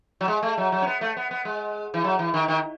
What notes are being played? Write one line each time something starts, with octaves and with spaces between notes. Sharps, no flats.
F#3
G#3
A3
F#3
F#3
C#4
B3
A3
B3
B3
G#3
E3
F#3
E3
D#3
D#3